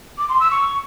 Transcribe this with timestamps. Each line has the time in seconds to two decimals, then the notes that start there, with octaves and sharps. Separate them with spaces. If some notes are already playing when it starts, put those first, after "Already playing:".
0.18 D6
0.29 C6
0.40 E6
0.51 C#6